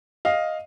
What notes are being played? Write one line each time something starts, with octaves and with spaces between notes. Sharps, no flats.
D#5 F5